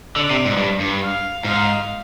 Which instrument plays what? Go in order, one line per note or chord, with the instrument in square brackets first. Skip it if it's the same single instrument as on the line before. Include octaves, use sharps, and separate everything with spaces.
[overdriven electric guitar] D3 [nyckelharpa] D5
[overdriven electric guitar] C3
G#2
G2
G2
[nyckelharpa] F5
[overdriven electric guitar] G#2 [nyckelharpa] F5